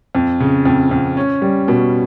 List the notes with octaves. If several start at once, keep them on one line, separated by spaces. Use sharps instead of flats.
F2
C#3
F2
F2
C#4
G3
B2